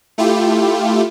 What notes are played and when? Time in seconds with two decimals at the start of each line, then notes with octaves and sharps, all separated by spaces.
0.18 A3 E4 F4 G4